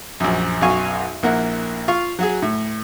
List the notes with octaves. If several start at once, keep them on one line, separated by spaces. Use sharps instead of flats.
A#1 F#2
B1 F#2 F#4 F5 G#5 C#6
A#1 A#3 E4 F#5
F4 F5 C#6
F#3 F#4 G#4
A2